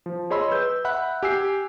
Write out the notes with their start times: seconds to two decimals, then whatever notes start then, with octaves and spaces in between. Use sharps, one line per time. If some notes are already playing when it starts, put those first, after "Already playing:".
0.06 F3
0.30 G#4 C#5 D#5 B5 C6 E6
0.51 B4 E6 G6
0.85 E5 F#5 B5 F#6
1.23 G4 G#5 E6 C7